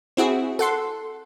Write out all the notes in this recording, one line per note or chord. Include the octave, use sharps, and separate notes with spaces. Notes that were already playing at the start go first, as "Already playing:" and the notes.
C4 E4 F#4 G#4
A4 F#5 C6